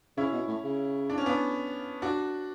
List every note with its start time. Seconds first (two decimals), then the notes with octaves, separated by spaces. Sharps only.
0.17 C#3 C#4 E4
0.33 B2
0.48 A2
0.64 C#3
1.10 D4
1.18 C#4
1.26 B3 D4
2.02 D4 F#4